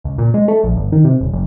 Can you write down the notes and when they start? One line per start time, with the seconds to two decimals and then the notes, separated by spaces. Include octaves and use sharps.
0.04 C#2
0.18 A#2
0.34 G#3
0.48 A3
0.63 A#1
0.77 G1
0.92 D#3
1.05 C3
1.21 D#1
1.33 F#1